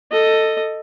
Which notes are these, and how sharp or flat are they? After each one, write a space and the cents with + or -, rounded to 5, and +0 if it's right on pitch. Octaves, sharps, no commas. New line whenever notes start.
A4 +15 D#5 +0